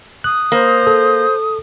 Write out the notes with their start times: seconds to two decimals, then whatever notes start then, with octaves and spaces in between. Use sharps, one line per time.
0.24 D#6 F#6
0.52 A#3 C5
0.87 A4